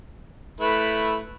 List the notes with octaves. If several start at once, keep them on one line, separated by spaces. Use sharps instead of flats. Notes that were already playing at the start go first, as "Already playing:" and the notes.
A3 E4 B4